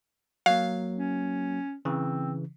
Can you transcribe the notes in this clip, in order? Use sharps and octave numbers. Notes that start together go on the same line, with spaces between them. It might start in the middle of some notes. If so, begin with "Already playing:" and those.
F#3 A#3 F5
C#4
C#3 E3 C4